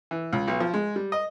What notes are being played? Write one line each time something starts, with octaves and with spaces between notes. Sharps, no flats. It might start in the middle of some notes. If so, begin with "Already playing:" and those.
E3
C#2
B1
F3
G#3
G3
D#5